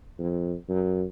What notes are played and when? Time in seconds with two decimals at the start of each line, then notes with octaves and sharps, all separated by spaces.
0.19 F2
0.69 F#2